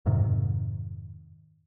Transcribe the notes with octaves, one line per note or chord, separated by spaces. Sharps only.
F2 G#2 C3 D#3